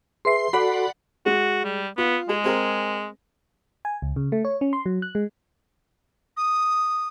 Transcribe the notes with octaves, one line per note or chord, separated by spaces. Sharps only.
G#4 B4 E5 C6 C7
F#4 A4 D5 F#5 B5
G#3 F#4
G3
B3 F4
G#3 G#4
C4 G#4 A#4
G#5
C#2
C#3
A3
C#5
C#4
C6
F#3
F#6
G#3
D#6